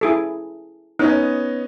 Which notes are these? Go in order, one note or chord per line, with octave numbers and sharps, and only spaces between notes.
E4 G#4 A4
B3 C#4 D#4 D#5